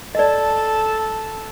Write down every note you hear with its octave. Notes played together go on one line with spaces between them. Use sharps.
A4 D5 D#5 A5